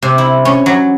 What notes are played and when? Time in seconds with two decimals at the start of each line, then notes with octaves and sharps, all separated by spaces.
0.02 C3
0.18 E4
0.45 C#4
0.66 F#3